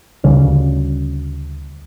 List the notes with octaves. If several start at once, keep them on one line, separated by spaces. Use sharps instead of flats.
D2 C#3 G3 C#4